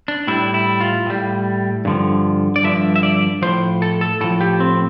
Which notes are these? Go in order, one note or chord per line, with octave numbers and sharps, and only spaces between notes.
D4
A2 G3 E4
E4
F4
A2 G3
G2 D3 F3
D5
G2 D3 F3 E5
E5
D5
A2 F3 C5
A4
A4
A2 F3 A4
G4
C4